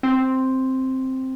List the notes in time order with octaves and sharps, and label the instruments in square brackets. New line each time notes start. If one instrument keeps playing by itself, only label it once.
[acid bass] C4